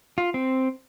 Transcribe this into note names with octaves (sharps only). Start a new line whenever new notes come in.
F4
C4